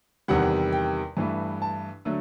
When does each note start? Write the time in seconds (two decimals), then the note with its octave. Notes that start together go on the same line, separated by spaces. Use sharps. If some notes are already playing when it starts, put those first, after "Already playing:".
0.28 E2 C3 D#3 G3 F#5
0.72 G5
1.17 G2 E3 A3
1.62 A5
2.05 D3 F#3 A3